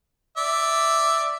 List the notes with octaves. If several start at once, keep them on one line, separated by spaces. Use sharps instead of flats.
D5 E5